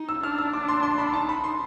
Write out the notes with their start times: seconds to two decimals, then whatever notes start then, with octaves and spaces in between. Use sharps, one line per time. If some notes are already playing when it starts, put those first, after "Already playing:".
Already playing: D#4
0.09 E6
0.23 D4 F6
0.38 E6
0.53 D6
0.68 C6
0.83 C6
0.98 B5
1.13 D#4 A5
1.29 B5
1.44 C6